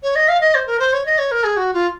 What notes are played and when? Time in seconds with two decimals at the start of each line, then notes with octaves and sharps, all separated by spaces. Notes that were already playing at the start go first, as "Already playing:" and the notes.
0.02 C#5
0.15 D#5
0.28 F5
0.40 D#5
0.54 C5
0.66 A#4
0.79 C5
0.93 C#5
1.05 D#5
1.18 C#5
1.31 A#4
1.43 G#4
1.56 F#4
1.73 F4